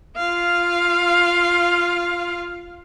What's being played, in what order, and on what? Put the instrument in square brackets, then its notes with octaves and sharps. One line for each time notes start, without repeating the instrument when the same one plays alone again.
[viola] F4 F5